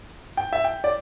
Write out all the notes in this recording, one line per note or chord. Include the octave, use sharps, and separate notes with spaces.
G5
E5
G5
D5